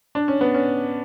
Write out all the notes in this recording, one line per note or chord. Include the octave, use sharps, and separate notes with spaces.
D4
C#4
B3
C#4